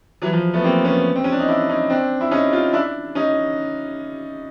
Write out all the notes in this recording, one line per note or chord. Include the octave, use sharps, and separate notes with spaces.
E3 F#3
F3
A3 B3
A#3 C4
B3 C#4
C4
C#4
D4
D#4
D4 E4
C#4 D#4
C4 D4
E4
C#4 D#4
D#4 F4
D4 E4
C#4 D#4